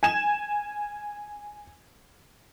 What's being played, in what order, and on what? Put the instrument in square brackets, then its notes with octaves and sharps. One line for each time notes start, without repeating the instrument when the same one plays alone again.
[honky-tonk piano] G#5 G#6 E7